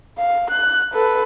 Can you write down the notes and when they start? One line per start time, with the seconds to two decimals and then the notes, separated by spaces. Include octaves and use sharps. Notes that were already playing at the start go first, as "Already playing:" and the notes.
0.18 F5
0.50 F#6
0.94 A4 B4